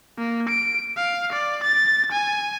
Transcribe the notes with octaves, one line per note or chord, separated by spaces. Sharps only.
A#3
D7
F5
D5
A6
G#5